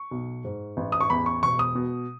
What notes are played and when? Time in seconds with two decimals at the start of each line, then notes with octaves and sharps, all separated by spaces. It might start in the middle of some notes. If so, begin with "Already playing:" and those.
Already playing: C#6
0.11 B1
0.44 G#2
0.77 A1
0.92 D#6
1.01 C#6
1.10 E2 B5
1.26 C#6
1.43 E1 C#6
1.59 D#6
1.75 B2